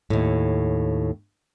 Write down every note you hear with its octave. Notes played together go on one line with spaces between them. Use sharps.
D#2 A2